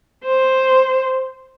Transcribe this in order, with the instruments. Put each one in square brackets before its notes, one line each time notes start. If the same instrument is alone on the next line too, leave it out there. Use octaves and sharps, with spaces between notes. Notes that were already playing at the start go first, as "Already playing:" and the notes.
[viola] C5